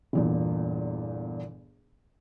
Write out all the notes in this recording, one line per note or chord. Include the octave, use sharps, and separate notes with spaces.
G1 E2 A#2